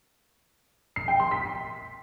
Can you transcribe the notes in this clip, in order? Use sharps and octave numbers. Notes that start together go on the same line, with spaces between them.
C7
G5
C6
B6